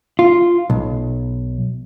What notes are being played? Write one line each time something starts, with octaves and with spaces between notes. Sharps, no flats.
F4
B1